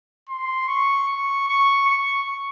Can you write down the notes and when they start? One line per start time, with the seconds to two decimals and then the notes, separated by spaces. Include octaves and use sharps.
0.29 C6
0.68 C#6
1.08 C#6
1.48 C#6
1.88 C#6